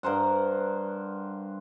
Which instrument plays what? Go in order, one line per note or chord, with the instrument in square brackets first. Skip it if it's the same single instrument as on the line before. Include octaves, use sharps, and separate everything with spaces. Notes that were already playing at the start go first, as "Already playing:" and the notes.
[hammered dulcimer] G2 A#4 C5 F#5